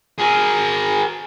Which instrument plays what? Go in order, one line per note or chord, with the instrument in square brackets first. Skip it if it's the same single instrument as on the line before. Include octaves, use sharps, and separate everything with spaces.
[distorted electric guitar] G#4 A#4